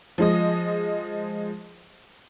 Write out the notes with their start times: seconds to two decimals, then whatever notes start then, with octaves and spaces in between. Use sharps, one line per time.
0.18 F3 G#3 D#5